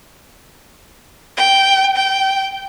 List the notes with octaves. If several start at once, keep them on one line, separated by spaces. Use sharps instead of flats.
G5
G5